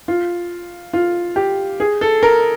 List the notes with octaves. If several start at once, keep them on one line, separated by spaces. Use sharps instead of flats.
F4
F4
G4
G#4
A4
A#4